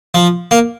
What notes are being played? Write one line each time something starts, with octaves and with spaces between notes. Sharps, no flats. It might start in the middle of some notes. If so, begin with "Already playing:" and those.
F3
A#3